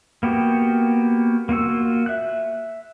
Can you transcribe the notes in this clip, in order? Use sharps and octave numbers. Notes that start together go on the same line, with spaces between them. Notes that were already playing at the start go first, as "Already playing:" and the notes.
A#3 B3 F#4 G4
A#3 F4 F#4 E6
E5 F#6